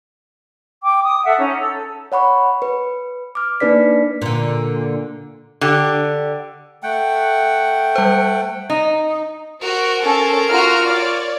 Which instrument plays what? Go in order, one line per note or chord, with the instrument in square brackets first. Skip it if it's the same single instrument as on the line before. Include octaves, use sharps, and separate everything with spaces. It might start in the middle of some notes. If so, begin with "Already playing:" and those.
[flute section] G5 D6
D#6
A4 E5 F#5
C#4 D#4
A4 E6
A4
[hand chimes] C#5 F#5 B5 C#6
B4
D6 F6
A#3 D4 D#4 B4 D5 B6
[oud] A#2 D3
[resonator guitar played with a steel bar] D3 G4
[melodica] A3 F#5 G5
[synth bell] G3 C5
[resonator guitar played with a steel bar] D#4
[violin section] F#4 [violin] A#4 C5
[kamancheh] C#4 [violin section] A4
[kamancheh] F4 F6 [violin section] F#4 A#5
[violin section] C#5 D5